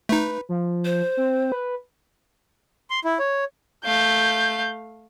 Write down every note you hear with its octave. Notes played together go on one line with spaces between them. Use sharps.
A3 D#4 B4
F3
C5
C4
B4
C6
E4
C#5
A3 F5 G6